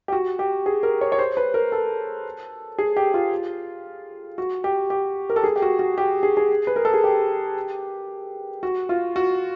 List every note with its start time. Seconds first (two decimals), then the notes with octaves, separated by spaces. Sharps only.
0.08 G4
0.12 F#4
0.39 G4
0.66 G#4
0.83 A#4
1.01 C#5
1.12 C#5
1.19 C5
1.37 B4
1.54 A#4
1.72 A4
2.79 G#4
2.97 G4
3.14 F4
4.38 F#4
4.64 G4
4.90 G4
5.30 A#4
5.36 A4
5.44 G#4
5.56 G4
5.62 F#4
5.79 F#4
5.98 G4
6.23 G#4
6.37 G#4
6.67 B4
6.76 A#4
6.85 A4
6.94 G#4
7.04 G4
8.63 F#4
8.89 F4
9.16 F#4